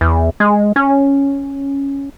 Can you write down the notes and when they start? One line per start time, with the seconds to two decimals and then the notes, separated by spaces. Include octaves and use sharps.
0.01 E2
0.40 G#3
0.76 C#4